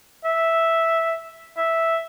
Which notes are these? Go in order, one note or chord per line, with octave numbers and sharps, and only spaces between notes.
E5
E5